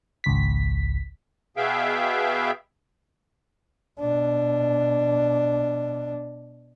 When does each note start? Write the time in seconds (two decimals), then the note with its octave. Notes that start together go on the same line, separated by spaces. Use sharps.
0.24 G#1 C#2 B6
1.57 B2 B3 G#4 E5 F5 G5
4.00 B2 D4